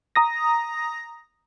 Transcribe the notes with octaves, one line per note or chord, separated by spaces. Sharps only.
A#5 D#6 A#6